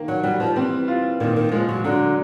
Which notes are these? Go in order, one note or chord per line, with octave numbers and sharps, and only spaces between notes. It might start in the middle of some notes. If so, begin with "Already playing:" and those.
Already playing: D#3 A#3
F#3
F#3 G3
F3
E3 C4
F4
A#2 D#3
D#3
F3 G#3
F#3
D3 F#3